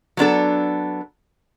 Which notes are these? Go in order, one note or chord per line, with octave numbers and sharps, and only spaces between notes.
F#3 B3 D4 A4